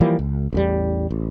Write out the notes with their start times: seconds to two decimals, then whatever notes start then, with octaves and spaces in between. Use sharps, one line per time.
0.01 E3 F3 G3 A#3
0.19 C#2
0.53 A1 E2 G3
1.11 A1